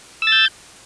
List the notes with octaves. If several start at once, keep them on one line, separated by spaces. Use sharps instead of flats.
E6 G6 A6